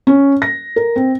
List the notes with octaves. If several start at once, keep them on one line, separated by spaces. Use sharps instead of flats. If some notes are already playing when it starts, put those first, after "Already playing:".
C#4
A#6
A#4
C4